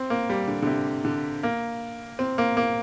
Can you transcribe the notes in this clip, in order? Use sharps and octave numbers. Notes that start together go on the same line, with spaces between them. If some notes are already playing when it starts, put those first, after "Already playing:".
Already playing: C4
A#3
G3
D3
D3
C3
D3
A#3
C4
A#3
A#3